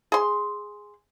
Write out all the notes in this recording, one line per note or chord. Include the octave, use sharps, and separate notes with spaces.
G#4 C6